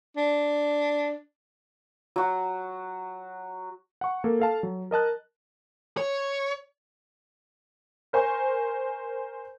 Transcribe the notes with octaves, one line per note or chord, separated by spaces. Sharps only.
D4
F#3 F#4
F#5 C#6
A#3 A4
A4 F5 A5
F#3
A#4 D#5 A5 F#6
C#5
A#4 C5 G#5 C#6